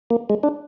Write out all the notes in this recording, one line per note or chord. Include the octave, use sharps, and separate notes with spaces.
A#3
G#3
D4